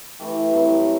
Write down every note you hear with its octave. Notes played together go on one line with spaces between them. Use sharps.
E3 A3 E4 G4
G2 F#3 C4 E4